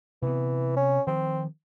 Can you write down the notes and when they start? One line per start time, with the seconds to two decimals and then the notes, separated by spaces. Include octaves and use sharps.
0.22 C3 E3 B3
0.76 C#4
1.07 D#3 F3 C4